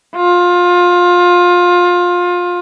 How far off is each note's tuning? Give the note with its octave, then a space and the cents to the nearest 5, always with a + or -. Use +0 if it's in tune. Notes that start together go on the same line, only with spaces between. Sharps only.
F4 +20